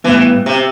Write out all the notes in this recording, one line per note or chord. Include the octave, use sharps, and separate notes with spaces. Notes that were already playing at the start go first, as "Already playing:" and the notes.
A2 E3 G3 B3
C3